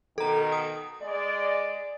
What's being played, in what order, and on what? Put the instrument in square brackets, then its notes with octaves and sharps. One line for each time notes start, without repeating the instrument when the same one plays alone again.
[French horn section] B2 D#3 [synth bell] A4 A#5
[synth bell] D#6
[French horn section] G#3 D5